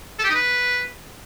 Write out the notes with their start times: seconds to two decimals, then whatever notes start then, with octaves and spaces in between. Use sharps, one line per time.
0.19 A4
0.24 G4
0.29 D#4
0.35 B4